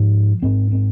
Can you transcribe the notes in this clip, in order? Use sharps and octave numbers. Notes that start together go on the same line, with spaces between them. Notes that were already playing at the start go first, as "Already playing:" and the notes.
Already playing: G#2 F3
G#2 C4
C4